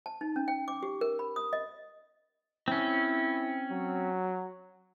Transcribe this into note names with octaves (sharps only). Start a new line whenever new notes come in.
A5
D#4
C#4
G5
D6
G4
A#4
B5
D#6
D#5
C4 C#4 E4
F#3